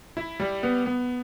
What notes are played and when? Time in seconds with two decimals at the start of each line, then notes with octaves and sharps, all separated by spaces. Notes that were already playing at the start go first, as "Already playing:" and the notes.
0.17 E4
0.40 G3
0.63 B3
0.86 B3